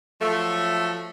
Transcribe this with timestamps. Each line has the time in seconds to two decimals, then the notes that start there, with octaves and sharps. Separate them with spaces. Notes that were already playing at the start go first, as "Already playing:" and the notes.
0.21 F3 F#3 A3